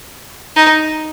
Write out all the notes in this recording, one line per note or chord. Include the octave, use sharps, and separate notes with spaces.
D#4